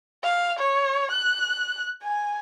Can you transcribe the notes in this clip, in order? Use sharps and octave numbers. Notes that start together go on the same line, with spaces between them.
F5
C#5
F#6
G#5